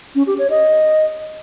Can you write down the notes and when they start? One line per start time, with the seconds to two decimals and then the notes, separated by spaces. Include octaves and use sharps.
0.15 C#4
0.27 G4
0.39 C#5
0.50 D#5